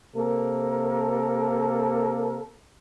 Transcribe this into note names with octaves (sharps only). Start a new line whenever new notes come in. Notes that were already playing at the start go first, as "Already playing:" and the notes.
C3 A#3 A4 A#4